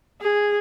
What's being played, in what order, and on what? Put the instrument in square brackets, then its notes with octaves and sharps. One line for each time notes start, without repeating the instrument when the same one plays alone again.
[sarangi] G#4